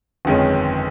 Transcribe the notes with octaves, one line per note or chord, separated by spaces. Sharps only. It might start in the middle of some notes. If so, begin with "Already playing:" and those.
G1 F2 D#3 G#3 C#4